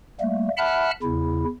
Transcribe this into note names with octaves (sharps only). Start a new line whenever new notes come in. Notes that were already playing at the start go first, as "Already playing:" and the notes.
G3 A3 A#3
E5 F#5 A5 B5 F6 F#6
E2 C#3 E4